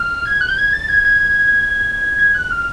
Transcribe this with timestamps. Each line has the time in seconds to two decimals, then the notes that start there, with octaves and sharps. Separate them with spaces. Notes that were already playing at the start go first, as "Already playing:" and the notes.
Already playing: F6
0.25 G#6
0.41 F#6
0.49 G6
0.58 G#6
0.73 A6
0.89 G#6
1.05 G#6
2.19 G#6
2.34 F#6
2.51 F6